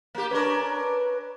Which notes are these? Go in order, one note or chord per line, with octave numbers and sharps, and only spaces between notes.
A#3 G4
C#4 D4 A#4 B4